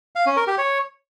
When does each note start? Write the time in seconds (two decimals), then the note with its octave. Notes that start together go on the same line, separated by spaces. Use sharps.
0.16 F5
0.26 C#4
0.37 A#4
0.47 G4
0.58 C#5